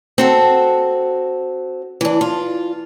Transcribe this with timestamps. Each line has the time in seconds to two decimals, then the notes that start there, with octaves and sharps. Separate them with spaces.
0.18 C4 F#4 A4
2.01 E3 D4
2.21 F4